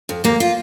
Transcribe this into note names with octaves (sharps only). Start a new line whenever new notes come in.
F2
D#2 A#3
F4